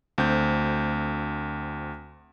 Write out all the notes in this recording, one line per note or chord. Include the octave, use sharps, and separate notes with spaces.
D2 C4 G6